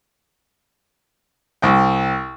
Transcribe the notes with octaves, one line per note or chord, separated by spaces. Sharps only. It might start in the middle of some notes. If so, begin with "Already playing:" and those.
C2 G5